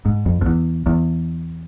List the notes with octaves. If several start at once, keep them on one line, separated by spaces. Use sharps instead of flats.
G#2
F2
F2
E2
E2